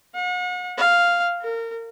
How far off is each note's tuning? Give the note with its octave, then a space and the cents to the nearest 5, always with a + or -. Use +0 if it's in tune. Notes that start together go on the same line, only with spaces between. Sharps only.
F#5 -40
F5 +0
A#4 -30